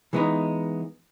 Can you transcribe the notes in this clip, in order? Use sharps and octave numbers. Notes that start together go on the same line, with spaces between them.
E3 G#3 B3 D#4